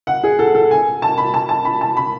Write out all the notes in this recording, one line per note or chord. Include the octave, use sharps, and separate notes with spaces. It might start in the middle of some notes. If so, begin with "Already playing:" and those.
F#5
G#4
A4
A4
G#5
A5
B5
A5
A5
B5
A5
B5